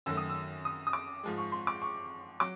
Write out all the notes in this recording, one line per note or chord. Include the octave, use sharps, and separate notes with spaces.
F#2 D#3 F#3 A3 E6
D#6
E6
D#6
D#6
D6
G#2 F3 G#3
C#6
C6
D6
C#6
F#3 D6